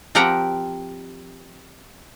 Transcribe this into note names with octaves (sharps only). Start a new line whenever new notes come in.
F3 C4 G4 A#4 F#5 A#5